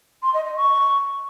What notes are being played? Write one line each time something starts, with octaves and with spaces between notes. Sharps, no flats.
C6
D#5
D#5
C#6